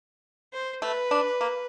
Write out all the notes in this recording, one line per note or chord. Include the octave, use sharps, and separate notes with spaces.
C5
A3 B4
D4
A#3